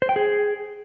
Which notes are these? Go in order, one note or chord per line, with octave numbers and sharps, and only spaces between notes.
C5
G5
G#4